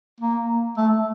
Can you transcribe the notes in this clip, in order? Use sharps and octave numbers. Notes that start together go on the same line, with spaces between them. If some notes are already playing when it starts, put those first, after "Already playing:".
A#3
A3